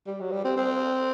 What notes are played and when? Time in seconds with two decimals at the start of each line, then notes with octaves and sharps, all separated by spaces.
0.06 G3
0.20 F#3
0.31 G3
0.44 C4
0.57 C4